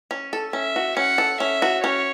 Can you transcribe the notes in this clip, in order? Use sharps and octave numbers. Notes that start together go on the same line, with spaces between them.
C#4
A4
C#4 E5
F#4
C#4 F#5
A4
C#4 E5
F#4
C#4 C#5